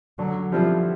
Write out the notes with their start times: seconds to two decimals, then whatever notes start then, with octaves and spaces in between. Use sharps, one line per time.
0.18 D3 F#3
0.52 F3 G3 C4 E4